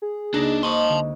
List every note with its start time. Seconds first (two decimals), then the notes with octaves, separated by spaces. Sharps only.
0.02 G#4
0.34 C#2 A#3 D4 D#4 F#4 C#5 A#6
0.63 A#3 C5 D#5 A5 C6 C#6
0.90 D3